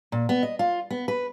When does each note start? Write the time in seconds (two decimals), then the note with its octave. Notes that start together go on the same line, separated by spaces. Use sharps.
0.12 A#2
0.29 B3
0.43 D#5
0.59 F4
0.90 B3
1.08 B4